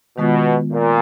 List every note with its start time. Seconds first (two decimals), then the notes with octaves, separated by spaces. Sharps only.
0.18 B2 D#3 G#3 B3 F4
0.71 A#2